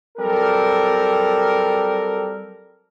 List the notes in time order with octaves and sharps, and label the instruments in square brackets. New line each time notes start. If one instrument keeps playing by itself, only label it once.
[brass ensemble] F#3 G3 C4 A4 A#4